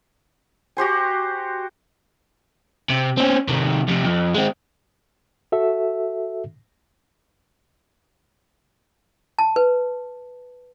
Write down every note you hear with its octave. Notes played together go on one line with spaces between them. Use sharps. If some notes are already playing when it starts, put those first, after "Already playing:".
F#4 G4 C5 G#5
C3
C4 C#4
C3 D#3
F2 C3
F2
G#3 C4
F#4 A4 E5
A5
B4